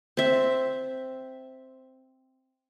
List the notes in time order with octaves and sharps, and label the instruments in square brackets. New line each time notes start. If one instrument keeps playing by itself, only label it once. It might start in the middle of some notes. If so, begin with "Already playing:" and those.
[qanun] C4 E5